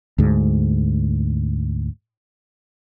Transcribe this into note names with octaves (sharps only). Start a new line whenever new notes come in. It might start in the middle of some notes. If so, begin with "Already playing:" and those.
D2 G#2